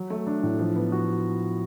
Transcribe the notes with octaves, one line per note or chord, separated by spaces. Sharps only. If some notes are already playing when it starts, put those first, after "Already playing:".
Already playing: F#3
A3
D4
A2
F3
B3
F#4